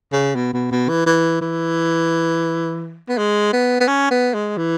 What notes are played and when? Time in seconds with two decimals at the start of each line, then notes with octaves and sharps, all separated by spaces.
0.12 C#3
0.35 B2
0.53 B2
0.71 B2
0.89 E3
1.06 E3
1.41 E3
3.09 B3
3.18 G#3
3.53 B3
3.80 B3
3.87 C#4
4.11 B3
4.34 G#3
4.57 E3